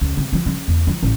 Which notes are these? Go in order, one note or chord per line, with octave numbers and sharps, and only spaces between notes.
C#2
C3
F3
C#3
E2
F3
A1